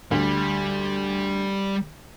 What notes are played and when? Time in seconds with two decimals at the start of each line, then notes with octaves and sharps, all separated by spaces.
0.11 D2 G3